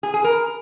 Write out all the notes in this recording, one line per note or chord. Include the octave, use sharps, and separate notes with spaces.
G#4
G#4
A#4